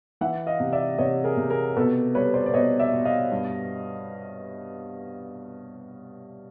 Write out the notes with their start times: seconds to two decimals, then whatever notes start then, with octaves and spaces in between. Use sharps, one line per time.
0.21 E3 E5 F#5
0.47 D#5 F5
0.60 C3
0.73 D5 E5
0.98 C3 C#5 D#5
1.24 G#4 A#4
1.37 C3
1.50 G#4 A#4
1.76 B2 A4 B4
2.15 G3 B4 C#5
2.34 C5 D5
2.46 D5
2.53 B2 C#5 D#5
2.79 D5 E5
2.93 B2
3.05 D#5 F5
3.32 G2